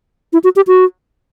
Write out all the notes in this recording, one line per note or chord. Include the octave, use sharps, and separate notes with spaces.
E4
F#4
G4
F#4